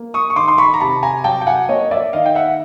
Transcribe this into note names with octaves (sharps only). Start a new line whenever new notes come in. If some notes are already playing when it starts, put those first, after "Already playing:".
Already playing: A#3
C#6 D#6
C#6
D#3 C6 D6
C6
B5 C#6
A#5
C3 A5 B5
G#5 A#5
F#3 G5 A5
G5
F#5 G#5
A#3 C#5 D#5
D5 E5
D#3 D#5 F5
G5
E5 F#5